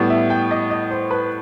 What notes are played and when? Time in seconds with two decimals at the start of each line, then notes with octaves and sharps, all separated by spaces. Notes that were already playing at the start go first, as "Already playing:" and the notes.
Already playing: A2 G3 B3
0.10 E5
0.30 G5
0.51 D#5
0.70 D#5
0.91 C5
1.11 B4